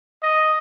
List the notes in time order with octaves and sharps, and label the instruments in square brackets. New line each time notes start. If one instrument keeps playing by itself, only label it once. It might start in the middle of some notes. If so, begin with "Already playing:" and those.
[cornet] D#5